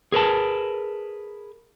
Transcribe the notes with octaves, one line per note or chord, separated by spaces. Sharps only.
G#4 A#4 B4 A5